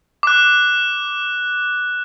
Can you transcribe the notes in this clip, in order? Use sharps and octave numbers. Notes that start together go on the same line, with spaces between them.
D6 F#6